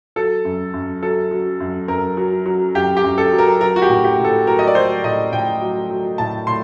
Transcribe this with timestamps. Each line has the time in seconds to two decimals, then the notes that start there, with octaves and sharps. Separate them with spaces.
0.16 F#3 A4
0.45 F#2
0.74 F#2
1.03 F#3 A4
1.31 F#3
1.60 F#2
1.88 F#2 A#4
2.17 F#3
2.46 F#3
2.75 F#2 G4
2.97 G4
3.04 F#2
3.18 A4
3.32 F#3
3.39 A#4
3.61 F#3 A#4
3.76 F#4
3.82 G4
3.89 A2
4.04 G4
4.18 A2
4.25 A4
4.47 F#3 A#4
4.59 D#5
4.67 D5
4.75 F#3 C5
5.04 A2 D#5
5.33 A2 G5
5.61 F#3
5.90 F#3
6.18 A2 A5
6.47 A2 C6